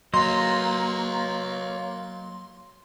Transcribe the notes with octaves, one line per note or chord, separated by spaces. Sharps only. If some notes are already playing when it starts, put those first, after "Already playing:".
F#3 A#3 C#5 D#5 C6